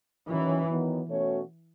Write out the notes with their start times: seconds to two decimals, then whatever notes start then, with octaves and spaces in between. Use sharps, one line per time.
0.28 D#3 E3 F#3 C#4
0.69 D#3 F#3 B3
1.08 B2 A3 C#4 F#4 C#5